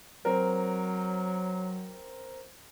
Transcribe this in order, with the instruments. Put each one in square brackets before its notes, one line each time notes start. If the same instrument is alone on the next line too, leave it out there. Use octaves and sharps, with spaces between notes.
[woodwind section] F#3 [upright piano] C4 A#4